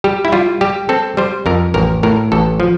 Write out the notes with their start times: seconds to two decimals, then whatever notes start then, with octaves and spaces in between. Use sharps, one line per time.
0.04 G3 G4
0.25 E4
0.32 G3 F4
0.61 G3 G4
0.89 C4 A4
1.17 G3 C5
1.46 F2 A#4
1.74 A1 A#4
2.03 A2 A#4
2.32 A1 A4
2.60 F3